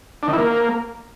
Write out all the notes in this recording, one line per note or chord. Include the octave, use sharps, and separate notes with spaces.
D4
D#3
E4
A#3